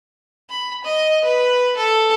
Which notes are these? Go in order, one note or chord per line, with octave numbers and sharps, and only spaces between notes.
B5
D#5
B4
A4